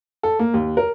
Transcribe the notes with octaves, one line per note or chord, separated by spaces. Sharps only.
A4
A#3
D#2
A#4